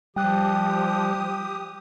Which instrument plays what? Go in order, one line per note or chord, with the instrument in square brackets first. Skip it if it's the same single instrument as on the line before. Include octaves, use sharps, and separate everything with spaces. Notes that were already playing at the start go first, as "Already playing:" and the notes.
[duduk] F3 [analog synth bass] G3 [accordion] G4 D#6 [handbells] G5 F#6